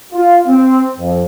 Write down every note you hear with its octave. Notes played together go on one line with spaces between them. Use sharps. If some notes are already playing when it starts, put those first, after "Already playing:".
F4
C4
F2